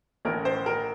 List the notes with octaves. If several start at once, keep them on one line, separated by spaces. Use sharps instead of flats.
A1 A2 A3 C#4 A#4
C5
A#4